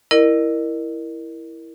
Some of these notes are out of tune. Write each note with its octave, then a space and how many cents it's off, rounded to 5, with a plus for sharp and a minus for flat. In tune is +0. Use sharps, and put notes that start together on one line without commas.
E4 +0 A#4 +0 D#5 -40